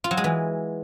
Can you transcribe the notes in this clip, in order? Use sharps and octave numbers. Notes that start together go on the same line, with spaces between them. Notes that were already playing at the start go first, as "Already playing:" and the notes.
F4
F#3
G#3
E3